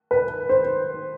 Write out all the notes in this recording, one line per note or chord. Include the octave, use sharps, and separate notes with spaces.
B4
C5